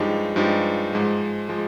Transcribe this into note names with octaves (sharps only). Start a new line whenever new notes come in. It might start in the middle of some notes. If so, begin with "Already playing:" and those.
Already playing: G2 F3 G#3 D#4 G4
G2 F3 G#3 D#4 G4
G#2 F3 G#3
F3 G#3